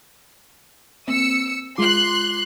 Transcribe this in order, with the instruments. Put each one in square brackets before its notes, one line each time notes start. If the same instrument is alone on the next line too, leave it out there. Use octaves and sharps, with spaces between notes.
[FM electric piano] A#3 C4 [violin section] E6 C#7
[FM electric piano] G#3 F4 D6 [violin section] C6 F#6